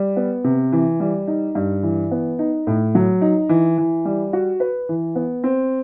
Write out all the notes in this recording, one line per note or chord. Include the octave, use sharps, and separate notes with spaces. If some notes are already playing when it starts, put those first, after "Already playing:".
Already playing: G3
B3
C3
E3
G3
D#4
G2
E3
B3
D#4
A2
F#3
D#4
E3
E3
G3
F#4
B4
E3
B3
C4